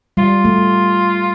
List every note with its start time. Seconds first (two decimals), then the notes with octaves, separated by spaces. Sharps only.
0.17 G3 F4
0.45 A3